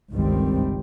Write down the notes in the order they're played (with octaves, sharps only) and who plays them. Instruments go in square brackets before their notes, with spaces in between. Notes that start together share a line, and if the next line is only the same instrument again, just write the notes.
[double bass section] G1 C#2 D#3 G3 C4